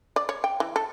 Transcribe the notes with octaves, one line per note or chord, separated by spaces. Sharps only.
D5
C#5
G5
E3
A4